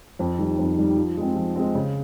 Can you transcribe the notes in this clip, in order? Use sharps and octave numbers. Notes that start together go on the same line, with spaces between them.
F2
D#3 G3
F2
D#3 G3
F3
G#3 C4
F3
G#3 C4
C#3